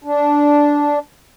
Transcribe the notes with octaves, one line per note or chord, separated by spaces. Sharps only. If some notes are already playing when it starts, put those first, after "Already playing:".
D4